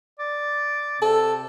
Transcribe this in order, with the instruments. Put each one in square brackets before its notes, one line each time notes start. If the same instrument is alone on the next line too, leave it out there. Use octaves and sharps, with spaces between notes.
[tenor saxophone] D5
[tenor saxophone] C3 [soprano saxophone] A4